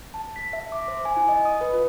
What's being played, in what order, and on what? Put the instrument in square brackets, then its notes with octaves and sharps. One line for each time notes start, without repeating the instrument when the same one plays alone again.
[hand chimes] A5
B6
E5
D6
C5
G#5
E4
D#5
D#6
B4
F4